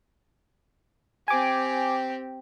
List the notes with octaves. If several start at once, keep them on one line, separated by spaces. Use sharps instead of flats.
C4 G4 G#5 D6